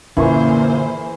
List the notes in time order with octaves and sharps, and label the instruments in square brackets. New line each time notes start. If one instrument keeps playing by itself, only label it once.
[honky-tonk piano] F#2 A#2 [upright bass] D3 [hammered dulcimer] E3 G#4 C#6 [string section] A#3 C5